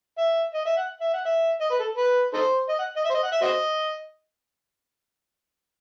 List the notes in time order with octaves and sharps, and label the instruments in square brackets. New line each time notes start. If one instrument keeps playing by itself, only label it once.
[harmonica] E5
D#5
E5
F#5
E5
F#5
E5
D#5
B4
A4
B4
D#4 A4 C5
D#5
F#5
D#5
E5
C5
D#5
F#5
E5
F#4 C5 D#5